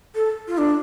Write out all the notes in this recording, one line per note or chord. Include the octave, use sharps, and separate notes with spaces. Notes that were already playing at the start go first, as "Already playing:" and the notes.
A4
F4
D4